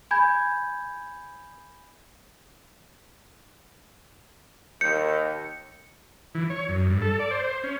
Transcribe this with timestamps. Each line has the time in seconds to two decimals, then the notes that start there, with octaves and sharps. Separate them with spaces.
0.11 G#5 B5 G6 G#6
4.81 D#2 G6 C#7
6.35 E3
6.50 C#5
6.69 F#2
6.90 G2
7.02 A4
7.19 D5
7.31 C5
7.44 C5
7.64 C#4